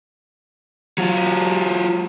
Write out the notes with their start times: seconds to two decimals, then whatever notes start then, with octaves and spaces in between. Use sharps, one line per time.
0.98 F#3 F4